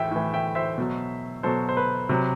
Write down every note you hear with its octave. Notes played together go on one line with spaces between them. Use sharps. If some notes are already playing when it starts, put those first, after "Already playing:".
Already playing: A2 E3 E5 G5
A2 E3
E5 G5
C5 E5
B2 F#3
B2 F#3 A4 C5
C5
B4
C3 F#3